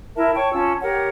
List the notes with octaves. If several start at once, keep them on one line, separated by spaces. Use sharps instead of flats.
E4 A#4 E5 A5
C#5 G5 A5 C#6
C#4 F4 A5 E6
G4 A#4 C#5 F#5